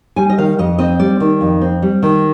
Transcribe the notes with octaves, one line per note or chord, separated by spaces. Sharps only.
G3 G#5
D#5
D#3 F5
F2 D#5
C4 D#5
G3 D5
D#3
F2
C4
G3
D#3